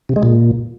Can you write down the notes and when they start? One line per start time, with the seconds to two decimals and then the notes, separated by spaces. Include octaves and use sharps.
0.09 C3
0.16 G#3
0.23 A#2